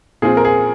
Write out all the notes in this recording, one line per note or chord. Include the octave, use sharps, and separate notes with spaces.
A#2 F3 C4 F4 G#4
A#4
G#4